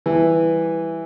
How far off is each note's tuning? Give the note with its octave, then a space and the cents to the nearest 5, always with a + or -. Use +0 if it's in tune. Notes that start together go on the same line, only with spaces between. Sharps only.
E3 +0 G3 +0